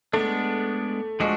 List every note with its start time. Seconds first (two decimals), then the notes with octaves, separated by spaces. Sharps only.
0.13 G#3 A3 B3 D4
1.20 F3 G#3 A3 D4 F#4